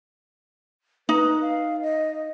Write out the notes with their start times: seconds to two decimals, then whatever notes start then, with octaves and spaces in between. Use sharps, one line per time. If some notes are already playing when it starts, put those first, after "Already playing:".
1.09 D#4 B4
1.41 F5
1.82 D#5